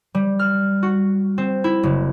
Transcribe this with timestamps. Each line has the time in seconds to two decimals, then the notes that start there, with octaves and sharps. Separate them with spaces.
0.15 G3
0.39 F6
0.83 F#4
1.38 C4
1.64 E4
1.83 F#1